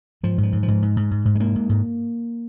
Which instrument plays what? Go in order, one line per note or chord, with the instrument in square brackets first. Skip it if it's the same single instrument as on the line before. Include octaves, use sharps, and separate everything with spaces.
[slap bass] G#2 F3
G#2
F3
G#2
F3
G#2
G#2
G#2
G#2
G#2
G#3
G#2 A#3
G#2
G#2